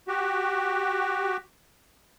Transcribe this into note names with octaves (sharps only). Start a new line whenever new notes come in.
F#4 G4